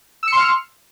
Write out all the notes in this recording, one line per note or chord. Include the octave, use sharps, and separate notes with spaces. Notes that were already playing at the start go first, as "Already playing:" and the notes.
C6 E6 F6 C#7